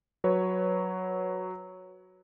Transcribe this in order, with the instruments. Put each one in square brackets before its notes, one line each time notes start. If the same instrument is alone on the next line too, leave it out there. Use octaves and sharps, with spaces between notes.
[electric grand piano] F#3 B4 C#5